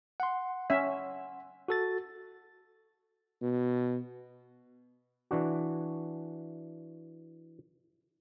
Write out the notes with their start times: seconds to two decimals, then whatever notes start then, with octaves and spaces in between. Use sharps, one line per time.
0.20 F#5 C6
0.70 C#4 E5
1.68 F#4 A4 A6
3.42 B2
5.31 E3 D4 F#4